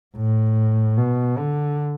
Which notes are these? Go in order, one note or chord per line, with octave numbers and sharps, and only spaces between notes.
A2
B2
D3